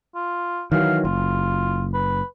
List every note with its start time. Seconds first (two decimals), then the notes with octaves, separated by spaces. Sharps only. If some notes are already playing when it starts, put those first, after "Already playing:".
0.15 F4
0.72 D#3 E3 F#3 F5
1.05 F#1 F4
1.94 B4